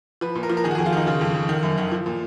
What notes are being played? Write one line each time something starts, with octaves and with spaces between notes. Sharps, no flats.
F3 B4
A#2
A#4
F3
A#4
D#3 G#4
F#4
F2 G#4
F4
D#3 D#4
C#3 F4
F2
F2
D#3
F#2
D#3
F3
A#2